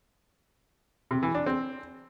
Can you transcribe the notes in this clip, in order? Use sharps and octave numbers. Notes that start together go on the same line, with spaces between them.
C3
E3
D4
C4